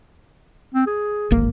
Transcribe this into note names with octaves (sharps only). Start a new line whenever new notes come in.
C4
G#4
D1 G#1 A#3